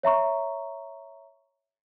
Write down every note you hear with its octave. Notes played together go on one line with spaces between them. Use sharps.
C#5 E5 A#5 C#6